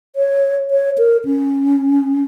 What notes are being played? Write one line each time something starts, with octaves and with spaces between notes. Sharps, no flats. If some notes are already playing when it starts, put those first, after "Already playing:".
C#5
C#5
A#4
C#4